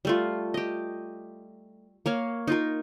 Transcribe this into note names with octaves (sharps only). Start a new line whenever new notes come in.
G3 A3 F4
G4 D#5
A#3 C#5 F5
D#4 F4 A#4